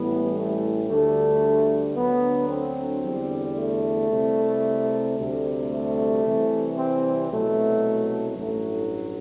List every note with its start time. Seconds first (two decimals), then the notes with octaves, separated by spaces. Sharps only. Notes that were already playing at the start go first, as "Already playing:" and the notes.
Already playing: A1 A2 E3 G3 B3
0.35 A3
0.89 D2 D3 G3 A3
1.95 D2 D3 F#3 B3
2.49 C4
3.03 E2 D3 G3
3.56 A3
4.10 C2 C3 G3
5.17 D2 C3 G3
5.70 A3
6.24 C2 C3 E3 G3
6.78 C4
7.31 C2 B2 F#3 A3
8.38 A1 G2 F#3 A3